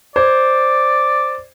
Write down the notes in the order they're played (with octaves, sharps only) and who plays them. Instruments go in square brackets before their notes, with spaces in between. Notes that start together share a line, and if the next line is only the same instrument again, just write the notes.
[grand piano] C5 G#6 [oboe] D5